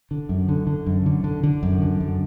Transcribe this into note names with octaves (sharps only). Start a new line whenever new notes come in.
D3
F#2
D3
D3
F#2
D3
D3
D3
F#2
D3
F#2